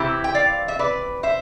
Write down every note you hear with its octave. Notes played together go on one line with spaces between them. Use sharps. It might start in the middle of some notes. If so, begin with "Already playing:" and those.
Already playing: C3 E3 C4 E4 G4
G5
D5 F5
E5
B4 D5
C5 E5